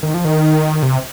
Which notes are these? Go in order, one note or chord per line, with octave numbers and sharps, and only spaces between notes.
D#3
F3
D#3
C3